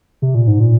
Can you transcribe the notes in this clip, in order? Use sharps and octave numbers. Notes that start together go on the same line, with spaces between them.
C3
A#2
G#2
A#2